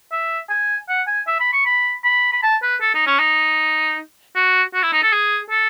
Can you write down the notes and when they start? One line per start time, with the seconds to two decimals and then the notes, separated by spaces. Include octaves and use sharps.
0.12 E5
0.49 G#5
0.89 F#5
1.07 G#5
1.27 E5
1.40 B5
1.53 C#6
1.66 B5
2.04 B5
2.32 B5
2.43 A5
2.62 B4
2.81 A4
2.94 D#4
3.07 C#4
3.19 D#4
4.36 F#4
4.74 F#4
4.83 E4
4.92 D#4
5.03 A4
5.12 G#4
5.50 A4